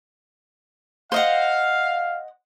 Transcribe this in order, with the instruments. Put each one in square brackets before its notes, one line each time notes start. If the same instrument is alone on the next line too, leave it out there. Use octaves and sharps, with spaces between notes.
[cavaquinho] C5 D#5 F#5 [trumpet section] F5